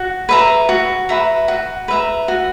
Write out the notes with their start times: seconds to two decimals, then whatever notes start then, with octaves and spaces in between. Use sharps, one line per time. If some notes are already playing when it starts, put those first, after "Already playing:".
Already playing: F#4
0.29 B4 E5 A#5
0.69 F#4
1.09 B4 E5 A#5
1.48 F#4
1.88 B4 E5 A#5
2.28 F#4